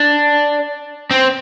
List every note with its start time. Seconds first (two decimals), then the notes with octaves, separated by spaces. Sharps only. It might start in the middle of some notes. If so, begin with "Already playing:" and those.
Already playing: D4
1.11 C4